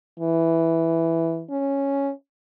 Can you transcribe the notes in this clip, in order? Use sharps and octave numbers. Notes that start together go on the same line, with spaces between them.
E3
C#4